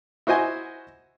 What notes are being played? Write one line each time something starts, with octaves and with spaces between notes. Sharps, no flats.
E4 F#4 C5 D#5 G#5